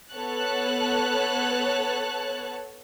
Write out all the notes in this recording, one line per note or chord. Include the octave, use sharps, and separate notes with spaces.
B3 A4 C#5 A5 F#6